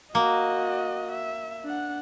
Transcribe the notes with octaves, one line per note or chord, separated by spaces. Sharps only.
A#3 F#4 D#5
E5
D4 F#5